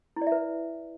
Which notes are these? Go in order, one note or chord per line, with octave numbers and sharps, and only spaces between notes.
E4
D5
E5
B4